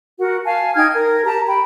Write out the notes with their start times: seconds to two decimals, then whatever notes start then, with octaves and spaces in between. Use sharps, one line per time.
0.19 F#4 A#4 F#5
0.45 F5 G#5 A5
0.75 D#4 G5 F6 G#6
0.94 A#4
1.25 G4 A5 A#5
1.48 G5 B5